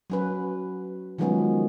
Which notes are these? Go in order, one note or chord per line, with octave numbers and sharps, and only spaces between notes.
F#3 C#4 B4
D#3 F3 F#3 G#3 B3 C#4